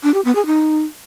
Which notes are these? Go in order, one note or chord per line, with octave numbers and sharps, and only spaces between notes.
D4
G4
B3
G#4
D#4